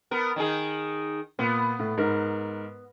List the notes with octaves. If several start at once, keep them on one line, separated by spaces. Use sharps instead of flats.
B3 A#4
D#3 D#4 G#4
A#2 B3
A2
G#2 A#4